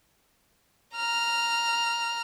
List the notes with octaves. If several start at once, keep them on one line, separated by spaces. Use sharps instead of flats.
A#5 F6